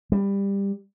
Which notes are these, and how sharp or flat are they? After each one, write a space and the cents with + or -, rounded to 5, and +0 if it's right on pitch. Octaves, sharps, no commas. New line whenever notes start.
G3 +15